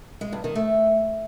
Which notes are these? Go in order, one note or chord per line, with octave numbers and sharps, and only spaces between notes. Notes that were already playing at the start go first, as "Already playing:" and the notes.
G#3
G2
D#3
A3